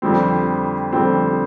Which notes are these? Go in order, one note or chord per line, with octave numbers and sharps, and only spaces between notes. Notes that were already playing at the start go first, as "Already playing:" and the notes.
F2 D3 G3 C4
F2 D3 G3 C4